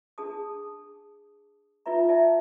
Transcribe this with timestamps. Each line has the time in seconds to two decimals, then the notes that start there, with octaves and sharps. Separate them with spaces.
0.18 D4 G#4 A5 D#6
1.86 D#4 F4 B4 E5 A#5
2.08 D5 E5 G5 A5